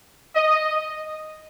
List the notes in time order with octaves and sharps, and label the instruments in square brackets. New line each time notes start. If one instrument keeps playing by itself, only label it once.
[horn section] D#5